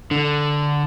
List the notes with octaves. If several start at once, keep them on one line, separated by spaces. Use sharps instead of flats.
D3